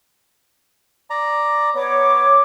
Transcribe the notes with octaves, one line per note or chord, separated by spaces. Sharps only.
D5 A#5
B3 C#5 D6